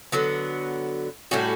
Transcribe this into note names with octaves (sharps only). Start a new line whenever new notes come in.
D3 F#3 B3
A2 G3 C#4 F#4